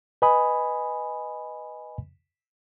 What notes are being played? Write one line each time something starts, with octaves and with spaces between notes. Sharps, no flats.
B4 D#5 G#5 B5 D#6